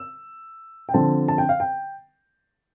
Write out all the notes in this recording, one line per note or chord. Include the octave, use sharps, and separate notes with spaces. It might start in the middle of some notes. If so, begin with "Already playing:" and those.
Already playing: E6
G5
D3 F3 C4 A5
A5
G5
F5
G5